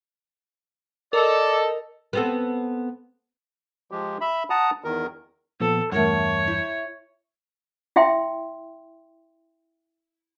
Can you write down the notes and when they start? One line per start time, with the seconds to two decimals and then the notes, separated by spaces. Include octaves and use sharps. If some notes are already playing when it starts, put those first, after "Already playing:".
1.13 A4 A#4 D5 D#5
2.13 B3 C4 A4
3.91 F3 G#3 G4
4.21 E5 B5
4.50 F#5 A5 A#5 D#6
4.84 E2 D#3 A#4
5.60 A#2 F3 B3 A4
5.92 E2 G2 A3 A#4 C#5 F#5
6.47 E4 C5
7.96 E4 E5 G5 C6